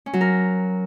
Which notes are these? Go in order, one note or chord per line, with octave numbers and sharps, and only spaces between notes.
C#4
F#3
A#4